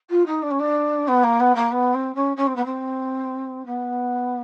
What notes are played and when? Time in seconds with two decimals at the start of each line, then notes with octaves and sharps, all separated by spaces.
0.10 F4
0.26 D#4
0.42 D4
0.51 C#4
0.59 D4
1.07 B3
1.23 A#3
1.40 B3
1.55 A#3
1.71 B3
1.94 C4
2.15 C#4
2.36 C#4
2.46 C4
2.56 B3
2.65 C4
3.66 B3